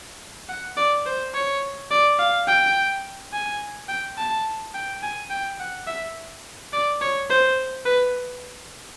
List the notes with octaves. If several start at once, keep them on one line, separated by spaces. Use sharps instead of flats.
F#5
D5
C5
C#5
D5
F5
G5
G#5
G5
A5
G5
G#5
G5
F#5
E5
D5
C#5
C5
B4